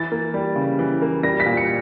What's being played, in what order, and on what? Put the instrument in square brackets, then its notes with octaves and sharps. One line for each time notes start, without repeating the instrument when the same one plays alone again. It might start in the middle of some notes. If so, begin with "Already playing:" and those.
Already playing: [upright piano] E3 A6
A#3
G3
C#3
E3
A#3
G3 A#6
B6
A#2
C#7